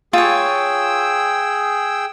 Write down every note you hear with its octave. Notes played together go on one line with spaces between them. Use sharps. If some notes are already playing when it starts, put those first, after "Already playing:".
F4 G#4 C#5 G5 E6